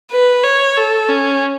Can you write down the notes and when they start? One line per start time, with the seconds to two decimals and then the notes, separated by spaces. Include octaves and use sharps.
0.12 B4
0.43 C#5
0.77 A4
1.09 C#4